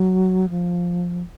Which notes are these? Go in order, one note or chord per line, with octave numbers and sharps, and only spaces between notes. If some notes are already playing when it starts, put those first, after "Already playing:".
Already playing: F#3
F3